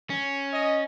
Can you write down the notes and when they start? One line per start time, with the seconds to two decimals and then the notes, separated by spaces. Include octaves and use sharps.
0.10 C#4
0.53 D#5